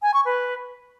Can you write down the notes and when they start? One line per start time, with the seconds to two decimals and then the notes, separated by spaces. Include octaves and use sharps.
0.02 G#5
0.14 C#6
0.25 B4